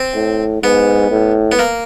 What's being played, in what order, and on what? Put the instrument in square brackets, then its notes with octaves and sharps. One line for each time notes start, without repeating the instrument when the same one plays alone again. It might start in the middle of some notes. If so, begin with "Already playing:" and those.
Already playing: [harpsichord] C4
[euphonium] A2
[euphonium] G#2 [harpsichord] B3
[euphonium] A2
[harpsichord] B3
A#3